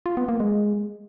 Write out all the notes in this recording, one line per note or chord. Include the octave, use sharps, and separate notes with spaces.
F4
B3
A#3
G#3